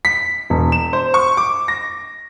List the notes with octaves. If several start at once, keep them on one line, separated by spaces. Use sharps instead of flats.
B6
E1
E7
C5
C#6
D6
A#6